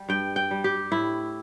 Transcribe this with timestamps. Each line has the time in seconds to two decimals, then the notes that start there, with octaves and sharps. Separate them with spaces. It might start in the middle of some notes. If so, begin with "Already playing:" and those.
Already playing: G3
0.09 G2 G5
0.36 G5
0.51 G3
0.64 G4
0.92 A2 E4